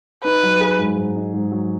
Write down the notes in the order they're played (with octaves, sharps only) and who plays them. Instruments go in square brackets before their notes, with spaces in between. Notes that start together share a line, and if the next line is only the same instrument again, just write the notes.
[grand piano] D#4 [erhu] B4
[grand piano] F#3
G#4
G#2
G#2
D#4
G#2
F#3